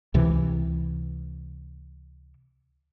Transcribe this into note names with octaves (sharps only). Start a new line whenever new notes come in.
C#2 C3 E3